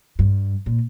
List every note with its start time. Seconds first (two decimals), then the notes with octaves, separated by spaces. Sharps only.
0.19 G2
0.66 A#2